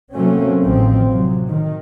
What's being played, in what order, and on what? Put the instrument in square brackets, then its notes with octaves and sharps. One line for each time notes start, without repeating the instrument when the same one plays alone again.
[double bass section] C3 F#3 A3 A#3 C4 C#4
A1 D#3 F3 C4
C3 F#3
D#3